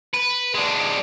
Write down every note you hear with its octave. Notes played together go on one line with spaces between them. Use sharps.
B4
G#3 D4